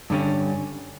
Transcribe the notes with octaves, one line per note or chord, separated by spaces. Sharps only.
G2 D3 G3 C#4